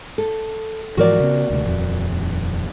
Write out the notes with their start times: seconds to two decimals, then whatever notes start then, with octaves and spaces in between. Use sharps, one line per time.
0.18 A4
0.97 G#2 E3 F3 F#4 A#4 D5
1.20 C#3 B3
1.50 D2 C3
1.64 D#1 F2